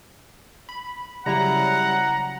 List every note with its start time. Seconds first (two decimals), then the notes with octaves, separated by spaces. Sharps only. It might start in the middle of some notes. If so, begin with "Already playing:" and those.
0.69 B5
1.26 C#3 F#3 G3 E4 F#5 A#5